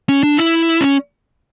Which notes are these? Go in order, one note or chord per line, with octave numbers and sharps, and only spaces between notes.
C#4
D4
E4
C#4